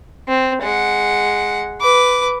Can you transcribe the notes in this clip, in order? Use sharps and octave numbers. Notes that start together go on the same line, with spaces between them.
C4
G#3 F#5
B4 D6